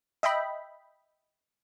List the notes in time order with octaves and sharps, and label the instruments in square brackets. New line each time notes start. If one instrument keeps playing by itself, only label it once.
[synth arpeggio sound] D#5 E5 G5 B5